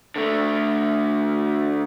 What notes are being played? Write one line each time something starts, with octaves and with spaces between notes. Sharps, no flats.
D3 A3